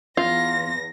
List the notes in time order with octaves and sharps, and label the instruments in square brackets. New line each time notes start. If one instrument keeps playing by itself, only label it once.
[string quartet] E2 A#6 [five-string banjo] F4